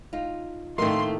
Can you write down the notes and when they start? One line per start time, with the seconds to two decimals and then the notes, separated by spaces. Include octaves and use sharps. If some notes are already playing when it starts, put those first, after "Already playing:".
0.13 D#4 F4
0.78 F2 A2 D#3 A3 A#3 D#5 C6